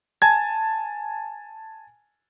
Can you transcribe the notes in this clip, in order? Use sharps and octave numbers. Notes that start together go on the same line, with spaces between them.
G#5 A5 G#6